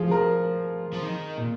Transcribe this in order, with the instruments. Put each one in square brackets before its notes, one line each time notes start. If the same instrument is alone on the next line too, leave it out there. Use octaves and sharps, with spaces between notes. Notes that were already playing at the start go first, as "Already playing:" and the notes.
Already playing: [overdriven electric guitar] F3 [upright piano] F4 G#4
[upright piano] A#4
[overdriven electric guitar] F3
D#3
A#2